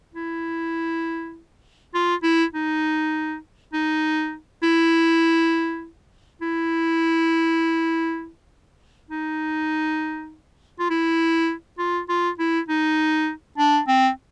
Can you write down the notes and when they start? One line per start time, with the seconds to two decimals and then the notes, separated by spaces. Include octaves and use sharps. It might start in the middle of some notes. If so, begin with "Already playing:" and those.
0.15 E4
1.94 F4
2.23 E4
2.53 D#4
3.73 D#4
4.63 E4
6.42 E4
9.10 D#4
10.79 F4
10.90 E4
11.79 F4
12.09 F4
12.39 E4
12.68 D#4
13.58 D4
13.88 C4